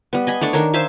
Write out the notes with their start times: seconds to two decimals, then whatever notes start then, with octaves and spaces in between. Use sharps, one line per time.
0.13 G3 B3
0.27 D#5 G#5 B5
0.41 A3 D4 D5 C#6
0.53 D#3 D4 A#4 C#5
0.73 C5 E5 F5 G#5